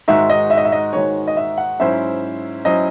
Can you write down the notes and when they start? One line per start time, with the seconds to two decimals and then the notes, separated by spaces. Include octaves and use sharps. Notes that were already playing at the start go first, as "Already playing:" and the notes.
0.08 G#2 D#3 G#3 D#4 F#4 E5
0.30 D#5
0.50 E5
0.57 D#5
0.65 E5
0.72 D#5
0.93 G#2 D#3 G#3 D#4 F#4 C#5
1.28 D#5
1.37 E5
1.58 F#5
1.79 G#2 F#3 C#4 E4 C5 E5
2.65 F#3 C#4 E4 C5 D#5